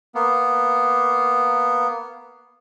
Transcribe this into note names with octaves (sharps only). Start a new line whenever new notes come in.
A#3 B3